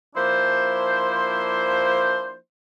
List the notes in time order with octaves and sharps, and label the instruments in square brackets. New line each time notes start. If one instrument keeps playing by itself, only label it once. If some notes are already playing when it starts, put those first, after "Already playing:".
[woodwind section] F3 A#3 D4 E4 C5